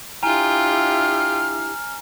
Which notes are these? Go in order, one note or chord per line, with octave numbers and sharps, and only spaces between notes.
D4 E4 F4 G4 G5 G#5 A#5 F6